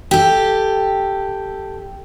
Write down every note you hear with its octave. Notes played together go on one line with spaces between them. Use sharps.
G4 A4